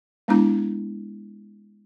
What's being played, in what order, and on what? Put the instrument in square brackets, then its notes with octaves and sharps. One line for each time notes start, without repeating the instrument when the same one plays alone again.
[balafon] G#3 B3 D4 E4 A#5